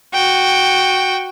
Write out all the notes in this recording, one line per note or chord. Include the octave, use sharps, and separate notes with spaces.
F#4 G5